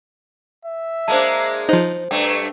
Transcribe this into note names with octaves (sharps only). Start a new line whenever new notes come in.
E5
G#3 A#3 D4 C5 A5
F3 D#4 C5
G2 A3 G5